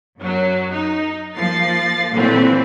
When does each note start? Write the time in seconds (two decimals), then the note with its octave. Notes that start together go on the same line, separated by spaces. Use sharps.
0.19 F#2 F#3
0.71 D#4
1.35 F3 A#3 A6 C7
2.12 A#2 D3 E3 F#3 A3 C4